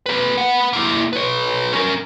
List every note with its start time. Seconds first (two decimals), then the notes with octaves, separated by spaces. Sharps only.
0.06 A#3 B4
0.37 B3 F#5
0.73 A#3 E4
1.13 B4 C#5
1.73 C#4 A#4